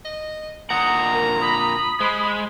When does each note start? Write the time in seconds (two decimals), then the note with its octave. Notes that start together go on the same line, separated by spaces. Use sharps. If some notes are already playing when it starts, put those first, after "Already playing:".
0.05 D#5
0.70 A#2 D3 F#5 A#5 D#6
1.13 A#4
1.41 B5 D#6
2.00 G#3 C5